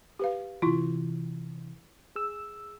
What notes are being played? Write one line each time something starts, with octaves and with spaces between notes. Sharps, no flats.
G4 B4 F5
C3 E3 E4 F4
G#4 E6